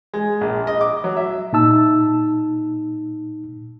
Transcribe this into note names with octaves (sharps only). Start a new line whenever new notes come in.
G#3
A#1
D#5
D6
F#3
E5
A#2 D#4 A5 E6